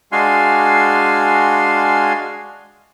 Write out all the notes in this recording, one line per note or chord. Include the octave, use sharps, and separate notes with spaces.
G#3 D4 F#4 F5 G#5 C6